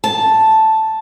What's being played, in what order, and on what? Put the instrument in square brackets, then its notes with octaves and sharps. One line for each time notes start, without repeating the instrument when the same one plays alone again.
[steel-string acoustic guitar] A5